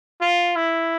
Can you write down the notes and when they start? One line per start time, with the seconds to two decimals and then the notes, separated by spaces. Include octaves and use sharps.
0.21 F4
0.56 E4